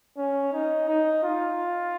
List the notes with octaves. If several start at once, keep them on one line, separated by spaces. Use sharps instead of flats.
C#4
D#4
D#4
F4